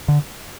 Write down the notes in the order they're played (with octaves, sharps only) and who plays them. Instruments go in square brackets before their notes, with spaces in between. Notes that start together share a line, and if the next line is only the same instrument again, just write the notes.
[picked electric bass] D3